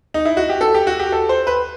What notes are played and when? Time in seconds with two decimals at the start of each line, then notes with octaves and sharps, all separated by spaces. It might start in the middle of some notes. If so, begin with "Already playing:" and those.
0.14 D#4
0.25 E4
0.37 F#4
0.49 G4
0.61 A4
0.74 G4
0.87 F#4
0.99 G4
1.12 A4
1.29 C5
1.47 B4